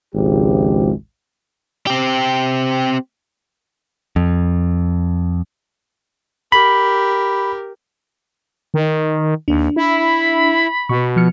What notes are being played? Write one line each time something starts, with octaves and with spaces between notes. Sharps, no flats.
G#1 C#2 F3 G#3 G4
C4 G4
F2
G4 A#4 B5
D#3
D#2 D4
E4 B5
B2 C#6
F3 F6 C#7